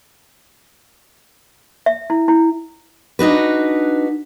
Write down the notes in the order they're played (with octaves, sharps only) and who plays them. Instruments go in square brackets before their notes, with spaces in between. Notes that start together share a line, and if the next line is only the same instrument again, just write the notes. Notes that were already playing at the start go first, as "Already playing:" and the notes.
[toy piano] E5
E4
E4
[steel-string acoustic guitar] D4 D#4 F#4 B4